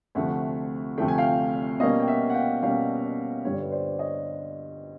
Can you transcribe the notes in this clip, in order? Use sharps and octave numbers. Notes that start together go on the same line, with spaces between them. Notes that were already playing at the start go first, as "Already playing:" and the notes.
D2 C3 F3 A3 E5 F#5
D2 C3 F3 A3 G5
G#5
F5 G5
B2 G3 A#3 C#4 D#5 F5
G5
E5 F#5
F#5
F5 G5
B2 G3 A#3 C#4 F5 G5
G2 D3 G3 C#5
D5
B4 C#5
C5 D5
C#5 D#5